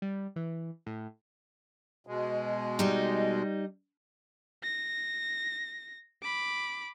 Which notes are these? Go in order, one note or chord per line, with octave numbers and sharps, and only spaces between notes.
G3
E3
A2
B2 G#3
G3 D#4
A#6
B5 D6